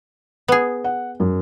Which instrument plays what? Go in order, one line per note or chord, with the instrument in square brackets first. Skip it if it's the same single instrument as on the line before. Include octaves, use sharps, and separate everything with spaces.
[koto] B3 G#4
[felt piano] F#5
F#2